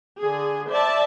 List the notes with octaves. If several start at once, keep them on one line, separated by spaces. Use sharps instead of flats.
D3 G#4
C5 D5 E5 A5